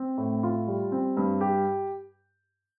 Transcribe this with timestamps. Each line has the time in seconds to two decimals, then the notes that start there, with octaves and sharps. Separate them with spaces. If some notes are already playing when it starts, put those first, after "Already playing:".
Already playing: C4
0.18 A2
0.43 F4
0.68 G3
0.92 C4
1.17 G2
1.41 G4